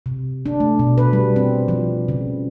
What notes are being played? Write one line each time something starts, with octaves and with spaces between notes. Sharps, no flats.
C3
D4
A3
B2
B4
G3
C4
F3
C#3